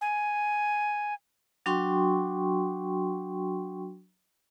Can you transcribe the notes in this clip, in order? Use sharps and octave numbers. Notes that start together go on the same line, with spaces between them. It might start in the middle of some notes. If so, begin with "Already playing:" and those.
G#5
F#3 D4 F#4 G5 C6 C#6